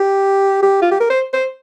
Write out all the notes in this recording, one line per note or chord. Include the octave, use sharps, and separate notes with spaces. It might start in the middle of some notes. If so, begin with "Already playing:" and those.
Already playing: G4
G4
F4
G4
A#4
C5
C5